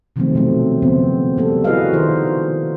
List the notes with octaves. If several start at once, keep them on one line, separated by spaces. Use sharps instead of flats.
C3 D#3 F3 F#3 A3 C4
B2 F#3 A3 C4
C#3 F3 B3 C4
G3 A#3 A4
E4 F#4 G#4 B4 D#5 F5
D#3 E4 F4 A#4 C5